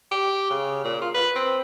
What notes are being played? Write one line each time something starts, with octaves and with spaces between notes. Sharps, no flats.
G4
C#3
A#2
F4
B4
C4